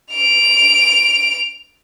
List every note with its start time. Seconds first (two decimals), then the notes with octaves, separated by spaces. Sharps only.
0.14 D7 F7